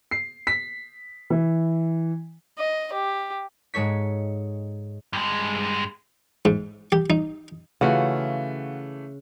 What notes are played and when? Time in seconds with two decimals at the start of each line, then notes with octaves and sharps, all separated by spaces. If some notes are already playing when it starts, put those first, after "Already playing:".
0.11 C7
0.47 B6
1.30 E3
2.58 D#5
2.93 G4
3.74 G#2 G#3 A4 C#5 B6
5.13 G2 G#3
6.45 G#2
6.92 G4
7.10 D#4
7.81 C#3 E3 A3 F4 F#4 F#5